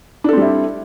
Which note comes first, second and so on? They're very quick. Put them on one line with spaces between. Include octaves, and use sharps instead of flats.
D4 A4 C4 G3 E4